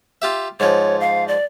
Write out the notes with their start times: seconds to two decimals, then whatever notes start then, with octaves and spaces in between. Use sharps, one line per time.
0.22 F4 G4 E5
0.60 G#2 F3 C#5
1.00 F5
1.28 D5